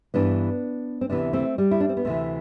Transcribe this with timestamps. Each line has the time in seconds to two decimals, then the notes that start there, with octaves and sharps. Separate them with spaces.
0.14 G2 E3 B3 D4
1.01 C4
1.09 D2 C3 E3 B3 D4
1.33 A3 C4
1.58 G3
1.71 E4
1.80 D4
1.89 C4
1.97 B3
2.05 D2 C3 E3 A3